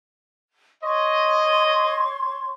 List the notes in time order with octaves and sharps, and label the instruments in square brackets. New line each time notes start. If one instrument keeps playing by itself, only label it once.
[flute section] C#5 C6 C#6 [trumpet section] D#5